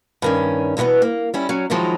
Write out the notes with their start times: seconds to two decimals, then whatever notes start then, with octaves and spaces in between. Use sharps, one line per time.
0.22 G2 D#3 C#4
0.77 E2 B2 D#3 E3 B3
1.02 A#3
1.34 G3 C#4 E4
1.49 F#3 C#4
1.70 D#3 F3 F#3 G#3 D#4 E4